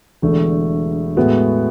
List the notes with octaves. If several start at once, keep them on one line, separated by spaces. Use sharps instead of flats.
E1 E2 D3 A3
A2 G#3 B3 F#4